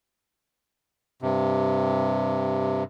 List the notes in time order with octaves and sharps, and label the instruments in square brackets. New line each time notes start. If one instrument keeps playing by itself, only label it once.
[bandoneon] G2 C3